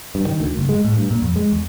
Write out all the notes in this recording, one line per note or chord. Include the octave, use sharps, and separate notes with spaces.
G2
D#3
D2
F#1
G#3
A2
G2
A#2
F2
G#3
E2